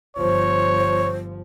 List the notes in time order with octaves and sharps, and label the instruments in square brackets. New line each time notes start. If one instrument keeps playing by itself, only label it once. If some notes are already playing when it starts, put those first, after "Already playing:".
[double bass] G1 F3 [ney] C5 [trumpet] C#5